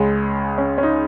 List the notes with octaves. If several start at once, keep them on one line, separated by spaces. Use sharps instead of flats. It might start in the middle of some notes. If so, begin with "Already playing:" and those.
Already playing: C#2 C#3 G#3 C#4
C#4
C#4
D#4